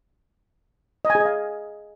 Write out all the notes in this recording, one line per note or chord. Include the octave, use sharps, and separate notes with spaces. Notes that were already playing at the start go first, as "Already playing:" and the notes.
D#5
G#5
G#4
D#5
F5